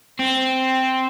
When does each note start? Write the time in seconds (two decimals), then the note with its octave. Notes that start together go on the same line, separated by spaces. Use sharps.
0.19 C4